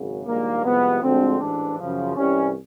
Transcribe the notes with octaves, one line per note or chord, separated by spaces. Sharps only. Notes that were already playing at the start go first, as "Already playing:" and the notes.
Already playing: G#1 F#2 C#3
A#1 G#2 D#3 G3 A#3
C2 C3 F3 G#3 B3
D2 D3 F3 G#3 C4
A1 G#2 E3 D4
F#2 C#3 F3
C2 C3 E3 G3 C#4